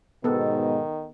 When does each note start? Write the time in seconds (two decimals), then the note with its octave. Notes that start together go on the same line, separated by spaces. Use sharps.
0.24 G#2 B2 D#3 B3 A4